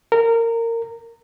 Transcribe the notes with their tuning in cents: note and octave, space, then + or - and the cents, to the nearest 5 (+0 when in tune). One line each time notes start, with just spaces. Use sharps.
A#4 -20